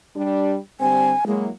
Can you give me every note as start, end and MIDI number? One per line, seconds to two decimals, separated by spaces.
0.16 0.56 55
0.16 0.56 62
0.80 1.13 50
0.80 1.13 55
0.80 1.13 60
0.80 1.25 80
1.27 1.49 54
1.27 1.45 56
1.27 1.49 58
1.27 1.49 64